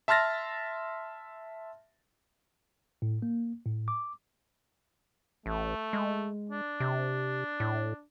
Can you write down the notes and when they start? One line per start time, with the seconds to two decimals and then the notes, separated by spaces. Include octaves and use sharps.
0.08 E5 A5 C6 F6 A6 A#6
3.02 A2
3.22 A#3
3.66 A2
3.88 D6
5.46 A1 A3
5.93 G#3
6.51 D4
6.80 C3
7.60 A2